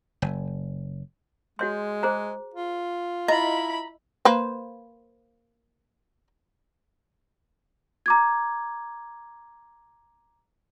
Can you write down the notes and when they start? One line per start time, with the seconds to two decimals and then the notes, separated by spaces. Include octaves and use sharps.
0.22 F#1
1.59 G#3 F#4 C#5 C6
2.03 G#4 C5 A#5
2.54 F4
3.28 E4 D#5 A#5 B5
4.25 A#3 B4 C5
8.06 A#5 D6 G#6